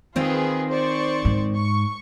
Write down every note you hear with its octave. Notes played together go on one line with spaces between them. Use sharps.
D#3 C4 D#4 F4 G#4 B4
C5 D5 C#6
G#2
C#6